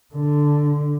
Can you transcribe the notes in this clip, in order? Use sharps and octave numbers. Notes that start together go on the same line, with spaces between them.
D3